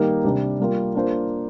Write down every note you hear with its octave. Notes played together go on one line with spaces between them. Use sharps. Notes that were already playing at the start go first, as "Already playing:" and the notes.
Already playing: D#3 G3 A#3 D#4 G4
C3 G3 D4
G3 A#3 F4
A#3 D4 F4 C5